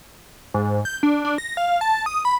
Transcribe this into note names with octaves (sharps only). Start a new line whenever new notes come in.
G#2
G6
D4
D4
A#6
F5
A5
D#6
B5